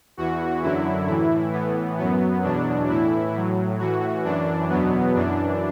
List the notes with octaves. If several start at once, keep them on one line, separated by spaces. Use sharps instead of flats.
E2 E3 F#4
F#2 D3 F#3 E4
A2 E3 E4
A2 E3 B3
F#2 F#3 B3
E2 B2 F#3 D4
A2 E3 E4
A2 F#3
A2 E3 F#4
F#2 E3 D4
E2 B2 F#3 B3
F#2 E3 D4